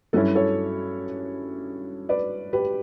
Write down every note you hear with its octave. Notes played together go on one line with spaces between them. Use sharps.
G2 F#3 C#4 E4 F#4 A4
A4 C#5
B4 D5
G4 B4